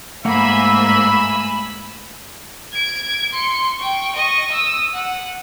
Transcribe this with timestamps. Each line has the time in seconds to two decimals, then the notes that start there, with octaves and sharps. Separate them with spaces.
0.25 G#2 A3 A#3 E5 F#5 G#5 B5 E6
2.73 G#6 D7
3.33 C6 C#7
3.78 G5 C#6
4.15 D#5 C#6
4.51 D#6 E6
4.94 F#5